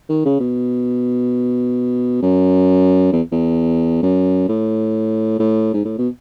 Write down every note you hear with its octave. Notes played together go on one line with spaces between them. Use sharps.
D#3
C#3
B2
F#2
E2
E2
F#2
A2
A2
G#2
A2
B2